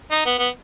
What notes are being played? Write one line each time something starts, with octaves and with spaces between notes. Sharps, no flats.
D#4
B3
B3